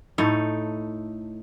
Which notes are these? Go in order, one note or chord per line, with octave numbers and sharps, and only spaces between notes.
A2 A3 D#4